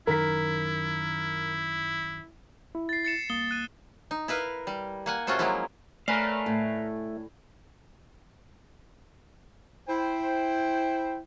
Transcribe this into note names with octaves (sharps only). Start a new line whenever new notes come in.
F#2 D#3 E4 A#4 B6
E4
A6 C7
A6 C#7 E7
C2 A#3 D#6 G7
F#6 D#7
D#4
E4 A#4 B4 F5
G3
A#3 F#5 G#5
C3 C#4 F4 F#4 A4 C5
F3 F#3 G#3 A#3 E4
A3 A#4 B4 C#5 D5 F5 G#5
A2
E4 C5 G5